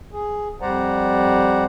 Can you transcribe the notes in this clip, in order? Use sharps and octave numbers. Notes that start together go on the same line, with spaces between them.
G#4
F2 G3 C5 D5 F#5 A#5